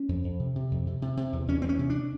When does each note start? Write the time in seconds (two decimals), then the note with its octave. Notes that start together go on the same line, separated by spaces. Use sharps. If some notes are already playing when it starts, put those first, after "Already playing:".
Already playing: C#4
0.09 F2
0.24 F2
0.39 C3
0.55 C3
0.71 F2
0.87 C3
1.02 C3
1.17 C3
1.33 E2
1.48 E2 C#4
1.62 E2 C4
1.69 C#4
1.79 C3
1.90 D4